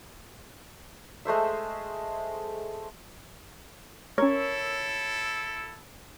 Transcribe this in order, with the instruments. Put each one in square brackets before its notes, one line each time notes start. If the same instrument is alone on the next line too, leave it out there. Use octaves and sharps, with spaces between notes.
[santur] G#3 A3 C5 E5
[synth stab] C#4 A#4 [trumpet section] E4 A4 [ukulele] C#5